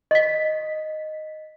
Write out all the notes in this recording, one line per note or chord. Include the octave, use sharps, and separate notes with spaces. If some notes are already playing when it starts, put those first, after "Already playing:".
D#5 B6